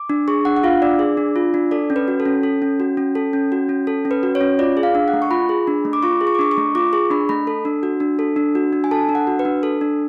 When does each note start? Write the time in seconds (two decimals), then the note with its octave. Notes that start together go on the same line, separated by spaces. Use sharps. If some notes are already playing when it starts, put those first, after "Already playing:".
Already playing: D6
0.10 D4
0.28 G#4 C#6
0.45 D4 F#5
0.57 F#5
0.64 F4 F5
0.82 D4 D5
0.99 G#4
1.17 D4
1.36 F4
1.54 D4
1.71 A4 D5
1.90 C#4
1.96 B4
2.08 F#4
2.20 A4
2.25 C#4
2.43 A4
2.62 C#4
2.80 F#4
2.97 C#4
3.15 A4
3.33 C#4
3.52 F#4
3.69 C#4
3.87 A4
4.05 C#4
4.11 B4
4.23 F#4
4.35 C#5
4.41 C#4
4.59 F4 D5
4.77 G#4
4.83 F5
4.95 D4
5.08 F#5
5.13 A3
5.22 C#6
5.31 F4 B5
5.49 G#4
5.67 D4
5.85 A3
5.93 D6
6.03 F4 C#6
6.21 G#4
6.27 C#6
6.35 D6
6.39 D4 C#6
6.51 C#6
6.57 A3
6.75 F4 D6
6.93 G#4 C#6
7.10 D4 B5
7.29 A3 B5
7.47 A4
7.65 D4
7.83 F#4
8.00 D4
8.19 A4
8.36 D4
8.55 F#4
8.73 D4
8.84 G#5
8.91 A4 A5
9.09 D4
9.15 F#5
9.27 F#4
9.39 B4
9.45 D4
9.63 A4
9.81 D4